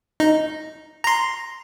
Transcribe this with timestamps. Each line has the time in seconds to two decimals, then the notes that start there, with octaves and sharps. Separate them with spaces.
0.20 D#4
1.04 A#5 C6